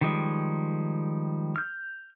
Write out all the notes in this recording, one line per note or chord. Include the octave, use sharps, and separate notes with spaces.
D#3 F3 G3 G#3
F6 G6